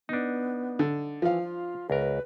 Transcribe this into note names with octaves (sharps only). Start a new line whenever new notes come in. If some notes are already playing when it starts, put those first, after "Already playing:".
B3 D4 D#4
D3
E3 F3 F5
F4
C#2 A#4 B4